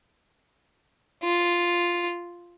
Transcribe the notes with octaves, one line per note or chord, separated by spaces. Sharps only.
F4